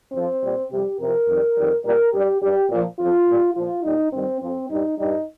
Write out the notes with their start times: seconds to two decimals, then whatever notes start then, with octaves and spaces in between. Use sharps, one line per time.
0.12 F2 F3 C4
0.42 A#2 G3
0.70 F2 C3 G3 G4
0.98 F2 C3 F3 A#4
1.28 F2 D#3 G3
1.56 F2 D#3 G3
1.84 A#2 G3 A#4
2.12 G2 G3 G4
2.41 G2 G3 G4
2.70 A#2 F3
2.98 F2 F3 F4
3.26 A#2 G3
3.55 A#2 F3 F4
3.84 A#2 G3 D#4
4.12 G2 D#3 G3 C4
4.41 F2 F3 C4
4.69 G2 G3 D#4
4.98 G2 G3 D#4